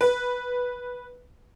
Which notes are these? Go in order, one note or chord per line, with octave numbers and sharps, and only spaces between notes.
B4